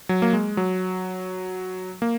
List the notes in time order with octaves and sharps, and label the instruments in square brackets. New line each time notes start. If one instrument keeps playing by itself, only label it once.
[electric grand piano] F#3
A#3
G#3
F#3
A#3